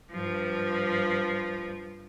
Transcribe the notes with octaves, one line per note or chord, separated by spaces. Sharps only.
G2 F3